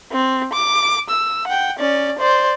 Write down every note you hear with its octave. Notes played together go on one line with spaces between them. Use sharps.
C4
D6
E6
F#5 G5
C#4 D5
C5 D5